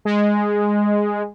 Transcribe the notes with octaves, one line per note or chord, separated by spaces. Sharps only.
G#3